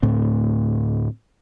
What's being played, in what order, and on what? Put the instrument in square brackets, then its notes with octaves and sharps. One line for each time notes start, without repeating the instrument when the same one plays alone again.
[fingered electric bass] D2 A2 A3 C4